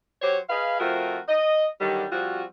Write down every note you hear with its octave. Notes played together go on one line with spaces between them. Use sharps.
F#3 G4 C5 C#5
G#4 B4 D#5 F5
F3 A3 C4 F4 F#4 A#4
D#5
D3 D#3 F#3 G3
F3 G3 C4 F4 F#4